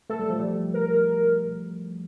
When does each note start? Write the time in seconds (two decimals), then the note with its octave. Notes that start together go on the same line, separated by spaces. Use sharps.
0.10 A3 A4
0.19 G3
0.30 F3
0.40 G3
0.74 A#4